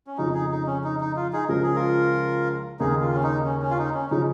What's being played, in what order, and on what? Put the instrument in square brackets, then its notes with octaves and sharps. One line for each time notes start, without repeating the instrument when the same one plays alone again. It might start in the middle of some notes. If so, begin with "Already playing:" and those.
[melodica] C#4
[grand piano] F2 C#3 F3 [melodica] D#4
[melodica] D#4 G#4
D#4
C#4
D#4
D#4
F4
D#4 G#4
[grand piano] C#2 C#3 F3 C#4 [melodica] A#4
[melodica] G#4
F4 A#4
[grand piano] D#2 C#3 A#3 [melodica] D#4 G#4
[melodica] F4
C#4
D#4
C#4
C#4
F4
D#4
C#4
[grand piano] C#3 F3 C#4 [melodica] D#4